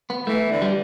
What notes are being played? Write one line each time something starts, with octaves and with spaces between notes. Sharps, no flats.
B3
E3 A3
D3
G3